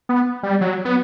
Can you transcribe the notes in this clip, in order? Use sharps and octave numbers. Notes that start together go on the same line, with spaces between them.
B3
G3
F#3
B3